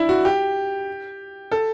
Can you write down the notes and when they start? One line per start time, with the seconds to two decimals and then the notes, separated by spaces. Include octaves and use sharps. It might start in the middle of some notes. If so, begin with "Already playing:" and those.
Already playing: D4 E4
0.09 F#4
0.25 G4
1.52 A4